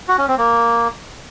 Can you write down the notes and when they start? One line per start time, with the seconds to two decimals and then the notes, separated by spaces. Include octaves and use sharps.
0.08 F#4
0.18 C#4
0.28 C4
0.38 A#3